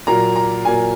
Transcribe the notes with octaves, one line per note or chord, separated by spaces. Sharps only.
A#2 F#3 A#3 A#5
A#5
A#2 F#3 A#3 G#5